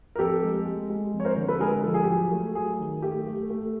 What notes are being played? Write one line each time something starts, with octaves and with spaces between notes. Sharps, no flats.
A#4
F2 G4 A4
G#3
G#3
G#3
F2
C#5
A#4 C5
D3
A4 B4
G#3 G#4 A#4
F3 A4
G#4
G4
F#3 G#4
A3
F#3 G#4
D#3
A3 G4
A3
A3